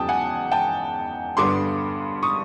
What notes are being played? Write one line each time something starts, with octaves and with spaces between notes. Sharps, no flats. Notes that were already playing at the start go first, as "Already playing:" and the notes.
Already playing: E2 C#3 F#3 B3 D#4 G5 A5 D#6
F#5 G#5
G5 A5
G2 D3 G3 B3 D4 C6 D6
C#6 D#6